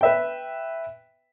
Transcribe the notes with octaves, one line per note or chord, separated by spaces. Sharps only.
B4 E5 G5